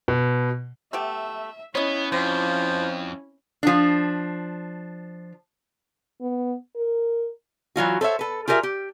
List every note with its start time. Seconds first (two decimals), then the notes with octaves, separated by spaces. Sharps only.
0.08 B2
0.93 A3 B3 G4 E5
1.75 B3 C#4 E4 C#5 D#5
2.12 F2 F3 C4
3.63 F3 D4
6.21 B3
6.76 A#4
7.76 E3 F#3 F4 F#4
8.01 A4 C5 C#5 E5
8.19 A4 B4
8.48 F4 G4 G#4 A#4 D#5 E5
8.63 G4